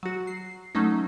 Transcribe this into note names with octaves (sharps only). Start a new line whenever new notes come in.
F#3 F#4
C7
F#3 A3 C#4 D#4